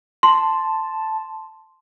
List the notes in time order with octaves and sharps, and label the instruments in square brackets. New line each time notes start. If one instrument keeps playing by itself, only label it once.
[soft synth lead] A5 [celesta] C6